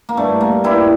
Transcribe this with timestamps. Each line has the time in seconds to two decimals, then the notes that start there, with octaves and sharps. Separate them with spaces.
0.09 A#3
0.17 G2 A3
0.41 A#3
0.64 G2 E4 G4